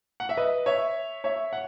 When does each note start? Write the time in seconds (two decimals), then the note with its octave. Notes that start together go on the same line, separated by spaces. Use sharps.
0.20 F#5
0.29 E5
0.37 B4 D#5
0.66 C#5 E5
1.24 C#5 E5
1.53 F#5